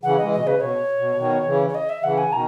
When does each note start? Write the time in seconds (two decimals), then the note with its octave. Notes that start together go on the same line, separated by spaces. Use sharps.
0.03 C#3 E3 F#5
0.18 D#5
0.23 E3 G#3
0.32 B2 D#5
0.41 C#3
0.47 B4
0.60 B2 C#5
0.99 B2
1.18 B2 D#3
1.46 C#3 E3
1.68 C#5
1.74 D#5
1.89 E5
2.03 C#3 E3 F#5
2.18 G#5
2.32 B2 D#3 A#5